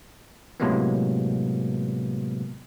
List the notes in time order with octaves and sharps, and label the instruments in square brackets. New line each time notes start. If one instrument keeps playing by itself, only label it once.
[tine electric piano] A2 C3 F#3 G#3 A#3 B3